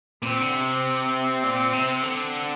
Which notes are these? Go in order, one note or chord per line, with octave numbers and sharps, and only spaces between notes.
A#2 C4
D3
C3
A#2
C3
D3